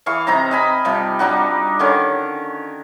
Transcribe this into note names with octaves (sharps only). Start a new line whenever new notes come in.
E3 G#4 F5 C#6
C3 C4 D#4 A#5
D#5 G#5 B5
C3 F3 G3
G3 D4 D#4 F#4
D3 D#3 C#4